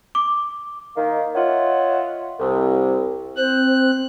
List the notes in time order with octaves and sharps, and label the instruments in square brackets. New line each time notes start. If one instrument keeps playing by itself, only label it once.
[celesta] D6
[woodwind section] D#3 A#3
F4 C#5 D#5 E5 F#5
C2
[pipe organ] C4 F#6 [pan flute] C5